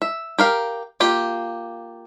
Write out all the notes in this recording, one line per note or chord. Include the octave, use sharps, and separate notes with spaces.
E5
G4 A#4 F5
A#3 F4 G4